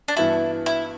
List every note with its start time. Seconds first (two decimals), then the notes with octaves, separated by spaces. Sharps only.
0.08 D4
0.16 G2 E3 B3 E4 F#4
0.66 E4